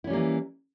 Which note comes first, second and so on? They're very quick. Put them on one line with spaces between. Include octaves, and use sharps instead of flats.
E4 C#4 G3 A#3 E3